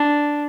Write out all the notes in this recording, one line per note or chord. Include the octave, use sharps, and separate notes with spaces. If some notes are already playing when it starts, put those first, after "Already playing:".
Already playing: D4